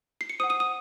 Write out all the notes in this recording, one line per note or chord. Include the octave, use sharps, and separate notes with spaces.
C7
C#7
C5 F#5 D#6 D#7
D#6 D#7
D#6 D#7